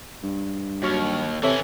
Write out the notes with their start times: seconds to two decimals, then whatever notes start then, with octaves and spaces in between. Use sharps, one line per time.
0.23 G2
0.83 D#2 F#3 C#6 F6
1.43 C3 E3 C#4 A4 C#5 E5